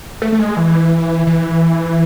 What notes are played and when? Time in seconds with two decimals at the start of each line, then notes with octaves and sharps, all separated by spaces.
0.22 A3
0.32 A3
0.39 G#3
0.57 E3
1.27 E3